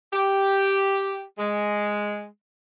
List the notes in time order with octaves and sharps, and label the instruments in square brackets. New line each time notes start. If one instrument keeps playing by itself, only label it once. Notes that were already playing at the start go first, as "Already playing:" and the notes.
[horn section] G4
G#3